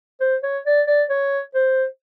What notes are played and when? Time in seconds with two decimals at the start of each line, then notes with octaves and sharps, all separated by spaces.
0.20 C5
0.43 C#5
0.66 D5
0.87 D5
1.09 C#5
1.54 C5